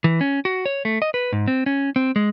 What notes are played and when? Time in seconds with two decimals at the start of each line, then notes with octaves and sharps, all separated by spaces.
0.04 E3
0.21 C#4
0.45 F#4
0.66 C#5
0.85 A3
1.02 D#5
1.14 B4
1.32 G#2
1.48 C4
1.66 C#4
1.96 C4
2.16 G#3